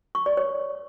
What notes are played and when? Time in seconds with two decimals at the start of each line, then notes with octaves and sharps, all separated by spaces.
0.15 C#6
0.26 D5
0.37 C#5